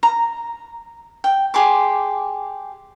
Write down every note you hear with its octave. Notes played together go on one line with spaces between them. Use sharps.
A#5
G5
G4 G#4 C6 D6